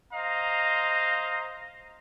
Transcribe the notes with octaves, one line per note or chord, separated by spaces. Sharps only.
C5 D#5 F5 A#5